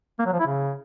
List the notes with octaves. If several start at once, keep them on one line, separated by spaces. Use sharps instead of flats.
A#3
F#3
F3
E4
C#3